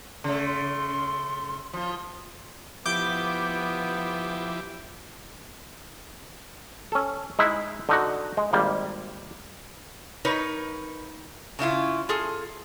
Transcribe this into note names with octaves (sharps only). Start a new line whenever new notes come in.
C#3 A3
C6
F3 F4
F3 B3 E4 G4 D6 G6
C#4 A4
G#3 D#4 E4
D3 D#4 F#4
G#3
G#1 G3 A#3
D#4 A#4 B4 C#5
C#3 C#4 E4 F4
F4 G#4 A4